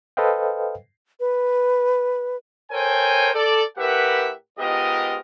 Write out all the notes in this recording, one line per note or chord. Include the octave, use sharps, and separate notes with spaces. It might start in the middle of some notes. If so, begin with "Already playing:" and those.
A4 B4 C5 D#5 F5 G5
B4
A4 A#4 C5 C#5 G5 G#5
A4 D5
A2 G4 A#4 B4 E5 F#5
G#2 B3 F4 G4 A#4 D#5